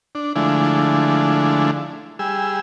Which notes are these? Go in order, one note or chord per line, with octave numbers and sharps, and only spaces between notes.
D4
D3 F3 G#3 A3 D4 E4
G3 G#4 E6